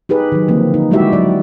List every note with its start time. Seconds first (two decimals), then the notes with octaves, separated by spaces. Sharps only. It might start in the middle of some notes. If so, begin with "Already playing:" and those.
0.09 D#4 G4 G#4 B4
0.32 D#3 F#3
0.48 D3 F3 A#3 C4
0.74 D#4
0.91 G3 G#3 E4 F#4 G4 E5
1.12 F#3 D5